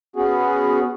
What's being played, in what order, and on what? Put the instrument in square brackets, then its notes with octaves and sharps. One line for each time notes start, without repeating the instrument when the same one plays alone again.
[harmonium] B3 C#4 F#4 G#4